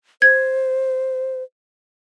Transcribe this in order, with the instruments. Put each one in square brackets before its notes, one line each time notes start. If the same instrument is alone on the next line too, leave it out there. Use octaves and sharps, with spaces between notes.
[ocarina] C5 [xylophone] G#6